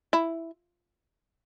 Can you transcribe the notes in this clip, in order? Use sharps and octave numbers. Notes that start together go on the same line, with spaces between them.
E4